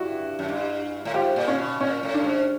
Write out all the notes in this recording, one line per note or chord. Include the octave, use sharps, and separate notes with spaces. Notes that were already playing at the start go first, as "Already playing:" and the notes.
Already playing: G2 E4 F#4
F#2
G2
A2
G#2 F4 G4
A#2
C#4
B2
A#2 C#4
A2
G2 D4
G#2